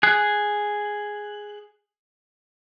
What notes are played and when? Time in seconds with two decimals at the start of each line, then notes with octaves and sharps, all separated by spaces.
0.03 G#4 F#6